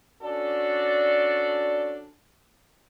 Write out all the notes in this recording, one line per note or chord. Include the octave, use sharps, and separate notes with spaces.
C#4 D4 F#4 A4 D5